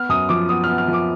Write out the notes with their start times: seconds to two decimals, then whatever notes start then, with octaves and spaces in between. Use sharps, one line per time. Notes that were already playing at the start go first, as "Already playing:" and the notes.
Already playing: B3 F6
0.09 F#2 D#6
0.29 F3 D6
0.49 B3 D#6
0.64 B3 F6
0.78 F6
0.88 F3
0.93 D6